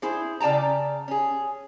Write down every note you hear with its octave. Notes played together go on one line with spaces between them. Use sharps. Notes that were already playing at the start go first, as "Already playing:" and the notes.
E4 G#4 C5
C#3 D5 G5 A5 A#5
C#4 G#4